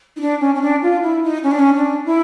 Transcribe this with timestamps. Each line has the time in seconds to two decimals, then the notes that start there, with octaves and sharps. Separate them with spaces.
0.16 D#4
0.20 D4
0.40 C#4
0.54 C#4
0.61 D4
0.82 F4
1.02 E4
1.23 D#4
1.43 C#4
1.51 D4
1.59 C#4
1.75 D4
2.05 E4